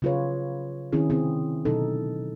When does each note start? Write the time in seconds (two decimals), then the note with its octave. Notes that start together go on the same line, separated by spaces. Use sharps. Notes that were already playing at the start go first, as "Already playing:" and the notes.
0.02 C#3 F#3 F4 G#4 B4 C#5
0.92 D#3 C4 C#4 E4 G#4
1.10 C3 C4 C#4 E4 G#4
1.65 B2 D3 F#3 D#4 A4